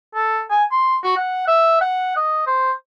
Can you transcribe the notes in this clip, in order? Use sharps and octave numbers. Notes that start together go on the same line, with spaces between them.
A4
G#5
C6
F#4
F#5
E5
F#5
D#5
C5